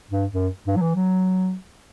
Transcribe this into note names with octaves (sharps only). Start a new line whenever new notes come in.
G2
F#2
G2
F#3
E3
F#3